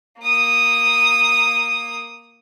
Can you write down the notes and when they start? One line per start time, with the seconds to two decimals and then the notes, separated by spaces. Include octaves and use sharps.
0.22 A#3 D#6